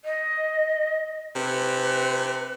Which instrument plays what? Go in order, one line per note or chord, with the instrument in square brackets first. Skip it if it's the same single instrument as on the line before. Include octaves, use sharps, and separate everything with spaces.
[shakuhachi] D#5
[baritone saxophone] C3 [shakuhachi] B4